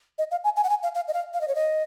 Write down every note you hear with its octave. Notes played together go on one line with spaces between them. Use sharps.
D#5
F5
G#5
G#5
F#5
G#5
F5
F5
D#5
F5
F5
D#5
C#5
D#5